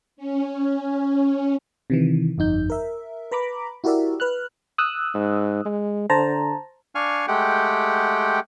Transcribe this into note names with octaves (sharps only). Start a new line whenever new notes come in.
C#4
C3 D#3 E3
G1 F2 D#4 G6
A#4 E5
B4 A#5 B5 D6
E4 F#4 G4 A#4 D5 E5
B4 F6 F#6
D#6 E6 F#6
G#2
G#3
D3 C5 A5 A#5
D4 F5 G#5 C#6 F6
G#3 A3 G4 F#5 G5